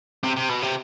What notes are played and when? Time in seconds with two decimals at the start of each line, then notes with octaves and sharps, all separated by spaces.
0.24 C3
0.36 C3
0.49 B2
0.62 C3